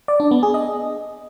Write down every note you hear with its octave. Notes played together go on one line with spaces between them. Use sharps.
D5
D4
B3
G#4
D#5